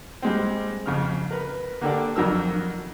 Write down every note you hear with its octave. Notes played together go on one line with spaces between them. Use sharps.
G3 G#3 C4
F2 C#3 F6
A#4 B4
D3 A#3 D4 G4 A4 D5
F2 D#3 F#3 A#3 A#4 E6